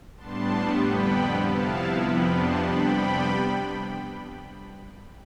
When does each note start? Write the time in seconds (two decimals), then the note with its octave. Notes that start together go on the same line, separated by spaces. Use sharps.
0.16 A2 G3 B3 D4 A5 C6
0.79 F2 D3 G3 B3 G5 B5
1.41 C3 F3 B3 E4 F5 A5
2.03 F2 C3 F3 B3 D4 G5 B5
2.35 A5 C6
2.66 C3 G3 B3 D4 G5 B5